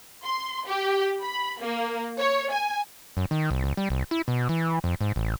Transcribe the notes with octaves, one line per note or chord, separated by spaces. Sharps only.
C6
G4
B5
A#3
C#5
G#5
F#2
D#3
C2
C#2
G3
C2
E4
B2
E3
F2
G#2
A1